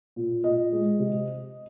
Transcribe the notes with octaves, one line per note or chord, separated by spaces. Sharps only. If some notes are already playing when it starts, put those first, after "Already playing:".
A#2
A#2 D#5
G#3
C3